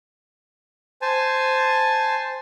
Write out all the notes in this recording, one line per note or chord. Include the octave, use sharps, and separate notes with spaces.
C5 G#5 A5